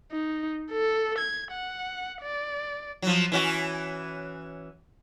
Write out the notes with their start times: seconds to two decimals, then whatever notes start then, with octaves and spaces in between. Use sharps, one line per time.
0.12 D#4
0.71 A4
1.19 G#6
1.51 F#5
2.22 D5
3.02 F3 F#3
3.32 E3 C#4 F#4